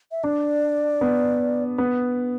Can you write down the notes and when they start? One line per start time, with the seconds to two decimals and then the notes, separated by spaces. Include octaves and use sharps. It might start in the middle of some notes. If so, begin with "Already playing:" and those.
0.11 E5
0.24 D4 D5
1.01 B3
1.78 B3